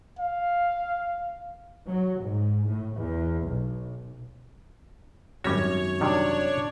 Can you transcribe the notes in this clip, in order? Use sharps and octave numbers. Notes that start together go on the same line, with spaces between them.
F5
F#3
G#2
A2
E2
B1
G#1 F#2 G3 C#4 F#4 C#5
C3 D#3 G3 D4